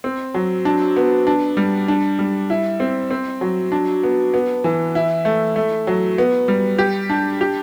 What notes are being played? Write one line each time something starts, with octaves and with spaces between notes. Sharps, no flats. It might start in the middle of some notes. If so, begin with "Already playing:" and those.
C4
F#3
D4
B3
D4
G3
D4
G3
E4
C4
C4
F#3
D4
B3
B3
E3
E4
A3
A3
F#3
B3
G3
G4
D4
G4